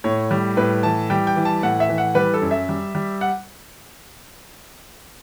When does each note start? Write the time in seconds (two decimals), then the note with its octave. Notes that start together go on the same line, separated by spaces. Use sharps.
0.04 A2 C#5
0.31 G3
0.57 A2 B4
0.83 E3 A5
1.10 G3 G5
1.27 G5
1.36 E3
1.45 A5
1.63 A2 F#5
1.80 E5
1.89 E3
1.98 F#5
2.15 G3 B4
2.34 A4
2.42 F#2
2.51 E5
2.69 G3
2.95 G3
3.21 F#5